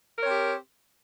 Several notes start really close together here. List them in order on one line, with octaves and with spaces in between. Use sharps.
A#4 C#5 C4 G4